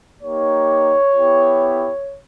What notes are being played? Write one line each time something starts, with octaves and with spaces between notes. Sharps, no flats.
A#3 D#4 G4 C#5
B3 E4 G4